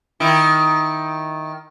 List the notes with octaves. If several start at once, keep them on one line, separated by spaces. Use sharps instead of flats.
D#3 E4